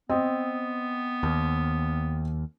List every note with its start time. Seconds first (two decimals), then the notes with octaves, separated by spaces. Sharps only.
0.10 B3 C4 D#5
1.23 D#2